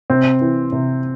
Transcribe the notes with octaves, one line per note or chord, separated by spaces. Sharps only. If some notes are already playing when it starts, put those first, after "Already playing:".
C3 C4
E3
C3